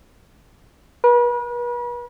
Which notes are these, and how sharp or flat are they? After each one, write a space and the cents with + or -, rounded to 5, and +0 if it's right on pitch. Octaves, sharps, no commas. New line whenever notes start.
B4 -40